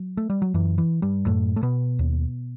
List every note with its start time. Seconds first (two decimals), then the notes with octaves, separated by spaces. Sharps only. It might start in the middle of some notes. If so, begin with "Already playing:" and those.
Already playing: F#3
0.17 A3
0.30 G3
0.42 F#3
0.54 F#2 E3
0.78 E3
1.02 G2 G3
1.26 F#2 A2 A3
1.56 A3
1.63 B2 B3
1.99 D#2